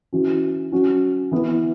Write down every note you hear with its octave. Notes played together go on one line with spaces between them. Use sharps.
E3 C#4 F#4
F#3 C#4 F#4
E3 B3 E4